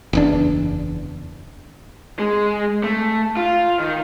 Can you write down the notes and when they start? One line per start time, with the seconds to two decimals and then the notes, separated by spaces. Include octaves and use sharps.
0.13 F#1 E2 D4
2.19 G#3
2.83 A3
3.37 F4
3.79 D#3